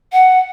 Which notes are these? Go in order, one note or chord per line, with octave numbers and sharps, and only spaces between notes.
F#5